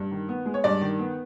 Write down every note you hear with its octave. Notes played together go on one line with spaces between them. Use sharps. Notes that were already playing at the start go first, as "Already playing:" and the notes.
Already playing: G2
D#3
B3
G#3
C#5
G2 D5
D#3
B3